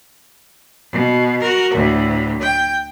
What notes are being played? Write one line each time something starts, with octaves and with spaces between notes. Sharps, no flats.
B2
F#4 A#4
D2 A2
G5